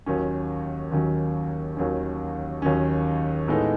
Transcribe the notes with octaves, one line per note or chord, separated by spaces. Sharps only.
D#2 D#3 F#3 C#4
D#2 D#3 F#3 C#4
D#2 D#3 F#3 C#4
D#2 D#3 F#3 C#4
A2 G#3 B3 D#4 A4